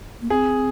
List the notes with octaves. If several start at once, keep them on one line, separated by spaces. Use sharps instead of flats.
A#3
C4 G#4